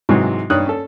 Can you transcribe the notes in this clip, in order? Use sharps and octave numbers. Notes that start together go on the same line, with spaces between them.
G#2 C3 E3 F#3 G#3
G2 D#4 C#5 D#6 F#6
C#4 A4